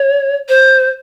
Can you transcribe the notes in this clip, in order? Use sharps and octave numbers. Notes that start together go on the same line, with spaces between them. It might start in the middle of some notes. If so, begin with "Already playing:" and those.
Already playing: C#5
C5